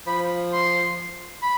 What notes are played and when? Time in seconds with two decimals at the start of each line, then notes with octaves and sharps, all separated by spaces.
0.07 F3 B5
0.53 C6
1.42 B5